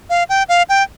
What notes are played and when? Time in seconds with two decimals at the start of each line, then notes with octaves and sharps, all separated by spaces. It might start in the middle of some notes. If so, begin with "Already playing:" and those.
0.10 F5
0.29 G5
0.49 F5
0.69 G5